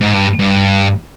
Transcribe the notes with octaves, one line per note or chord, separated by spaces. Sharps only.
G#2
G2
G2